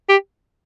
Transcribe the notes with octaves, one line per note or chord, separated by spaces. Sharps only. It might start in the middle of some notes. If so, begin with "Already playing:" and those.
G4